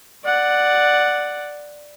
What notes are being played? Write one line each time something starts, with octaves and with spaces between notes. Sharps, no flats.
D5 F#5